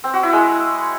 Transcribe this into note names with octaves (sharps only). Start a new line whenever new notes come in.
C4
F#4
E4
G#3